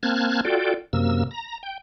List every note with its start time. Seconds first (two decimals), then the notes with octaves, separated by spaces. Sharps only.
0.03 A#3 C4 A5 F6 F#6 G#6
0.45 F4 F#4 A4 D5 G5
0.93 F#2 C3 A#3 E6
1.31 A#5
1.63 G5